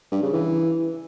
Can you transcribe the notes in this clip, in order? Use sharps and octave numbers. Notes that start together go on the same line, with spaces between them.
G2
C#3
E3